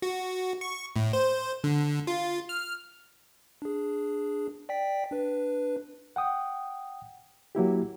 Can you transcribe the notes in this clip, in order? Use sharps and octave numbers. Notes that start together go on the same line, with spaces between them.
F#4
C#6
A2
C5
D3
F4
F6
D4 G#4
D5 G5 B6
D4 B4
F#5 G5 D#6
F#3 A#3 E4 G4